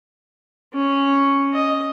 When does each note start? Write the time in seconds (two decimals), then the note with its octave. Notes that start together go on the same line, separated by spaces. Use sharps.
0.74 C#4
1.53 D#5